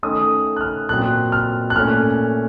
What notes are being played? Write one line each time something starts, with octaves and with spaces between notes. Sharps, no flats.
D#3 A3 C#4 D#6
F#6
F6
A#2 F#3 C4 F#6
F6
F#6
A#2 A3 C#4 F6